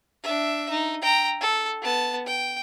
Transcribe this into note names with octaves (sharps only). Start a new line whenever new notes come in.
D4 E5
D#4
G5 A#5
A4
B3 A5
G5